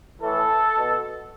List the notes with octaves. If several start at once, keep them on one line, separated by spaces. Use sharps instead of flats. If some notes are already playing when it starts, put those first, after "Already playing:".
A2 E3 A4
B2